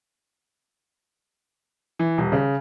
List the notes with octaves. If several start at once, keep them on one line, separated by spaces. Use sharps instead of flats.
E3
D#1
C#3